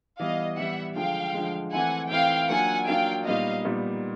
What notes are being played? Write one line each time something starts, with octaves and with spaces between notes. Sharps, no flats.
E3 G3 B3 D#5 F5
E3 G3 B3 E5 F#5
D3 F3 G#3 F5 G5
D3 F3 G#3
E3 A3 C4 E4 F#5 G#5
E3 A3 C4 E4 F5 G5
F#3 A#3 D4 F4 F#5 G#5
F#3 A#3 D4 F4 F5 G5
A#2 G3 B3 D#4 D#5 F5
A#2 G3 B3 D#4